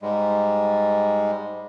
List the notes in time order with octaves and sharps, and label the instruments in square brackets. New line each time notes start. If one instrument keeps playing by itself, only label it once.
[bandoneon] G#2 G3 G#3